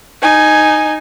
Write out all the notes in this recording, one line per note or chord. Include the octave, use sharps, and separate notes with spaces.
D#4 G#5